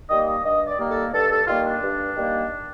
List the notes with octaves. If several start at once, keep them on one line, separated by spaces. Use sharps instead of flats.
D#3 G3 A#3 D#5
D#5
G2 D#5
D5
D#3 G3 A#3
A4
G2 A4
A4
D#3 G3 A#3 F4
D4
G2
D#3 G3 A#3